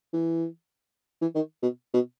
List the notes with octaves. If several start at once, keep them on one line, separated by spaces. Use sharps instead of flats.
E3
E3
D#3
B2
B2